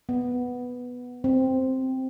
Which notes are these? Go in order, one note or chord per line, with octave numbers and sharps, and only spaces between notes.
B3
C4